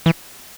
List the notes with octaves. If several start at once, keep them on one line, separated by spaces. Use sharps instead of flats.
E3